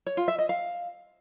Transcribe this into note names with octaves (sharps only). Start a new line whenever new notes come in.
C#5
F4
E5
D#5
F5